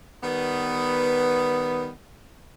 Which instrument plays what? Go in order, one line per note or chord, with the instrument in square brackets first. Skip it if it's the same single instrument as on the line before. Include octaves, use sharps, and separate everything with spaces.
[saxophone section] D#3 G3 B3